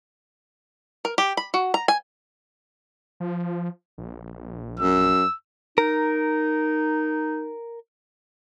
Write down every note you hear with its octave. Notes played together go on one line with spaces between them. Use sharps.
A#4
G4
B5
F#4
A#5
G#5
F3
A#1
F#2 E6
D#4 A#4